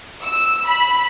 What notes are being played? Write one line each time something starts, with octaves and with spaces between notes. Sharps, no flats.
E6
B5